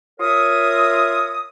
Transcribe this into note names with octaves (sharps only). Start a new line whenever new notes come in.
F4 A#4 C#5 E5 D#6